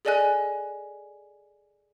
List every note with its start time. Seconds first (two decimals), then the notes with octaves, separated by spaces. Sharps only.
0.05 G#4 A4 D5 D#5 G#5 F#6